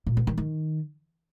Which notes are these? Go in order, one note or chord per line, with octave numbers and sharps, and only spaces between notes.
A#2
B3
D#3
D#3